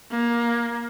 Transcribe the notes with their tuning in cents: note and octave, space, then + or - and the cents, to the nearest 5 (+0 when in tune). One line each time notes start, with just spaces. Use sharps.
A#3 +20